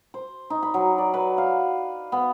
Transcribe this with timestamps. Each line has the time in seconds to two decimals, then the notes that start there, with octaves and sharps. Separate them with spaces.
0.14 C5
0.50 D#4
0.63 B5
0.74 F#3
0.98 D5
1.14 B4
1.38 F5
2.12 B3